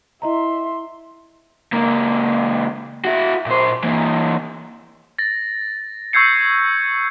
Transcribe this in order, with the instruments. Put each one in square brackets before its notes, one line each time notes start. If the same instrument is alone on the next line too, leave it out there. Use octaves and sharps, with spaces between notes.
[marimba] E4 D#5 A#5 [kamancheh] E5 C6
[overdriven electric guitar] C#2 A#3
E4 F#4
A#2 C5
E3 A#3
[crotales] A6 A#6
C#6 E6 G6 G#6 C7 C#7